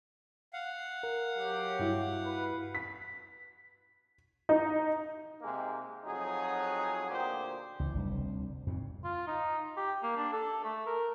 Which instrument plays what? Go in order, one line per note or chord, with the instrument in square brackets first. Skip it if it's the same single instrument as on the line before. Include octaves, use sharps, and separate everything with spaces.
[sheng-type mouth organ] F5 F#5
[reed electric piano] A#4
[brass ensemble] F#3 G4
[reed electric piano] G2 E4 F#4
[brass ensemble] B4
[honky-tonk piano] B6
D#4
[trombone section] C3 G#3 A#3 G4
F2 F#3 D#4 G#4
D2 A#2 G4 C5
[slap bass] C#2 E3
F1 D2 G3
F2 G#2 C#3
[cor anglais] F4
D#4
G4
A#3
D4
A4
A3
A#4